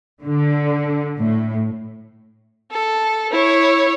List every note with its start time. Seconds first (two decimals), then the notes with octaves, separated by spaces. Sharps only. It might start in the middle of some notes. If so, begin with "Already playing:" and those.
0.22 D3
1.17 A2
2.71 A4
3.31 E4 C#5